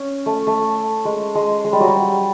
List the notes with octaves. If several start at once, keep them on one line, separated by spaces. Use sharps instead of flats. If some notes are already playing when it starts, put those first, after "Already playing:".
Already playing: C#4
A3
A3
G#3
G#3
G#3
G3
F#3
G3